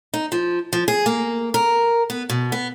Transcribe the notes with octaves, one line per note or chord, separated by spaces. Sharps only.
D#4
F3
F3
G#4
A#3
A#4
B3
B2
B3